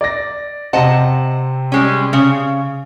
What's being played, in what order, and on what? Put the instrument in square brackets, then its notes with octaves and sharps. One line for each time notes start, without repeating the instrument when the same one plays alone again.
[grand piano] D5 A#6
[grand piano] C3 C4 [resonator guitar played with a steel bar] D#5 F#5 A5
[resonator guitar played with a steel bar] G3 G#3 C#4
C#3